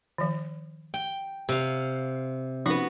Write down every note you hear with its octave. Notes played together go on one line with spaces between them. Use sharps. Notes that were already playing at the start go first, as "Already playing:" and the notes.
D#3 F3
G5
C3 F5
F3 B3 C#4 D#4 F#4